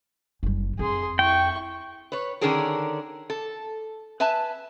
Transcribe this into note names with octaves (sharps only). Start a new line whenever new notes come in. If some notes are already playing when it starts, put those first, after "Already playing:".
F#1 G3
F2 G#4 C6
E4 G5 C#6
B4 C#5
D3 D#3 C#4 D4 G#4 A#4
A4
B4 E5 G#5 A5